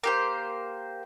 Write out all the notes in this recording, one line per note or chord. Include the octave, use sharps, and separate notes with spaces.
A#3 G4 C5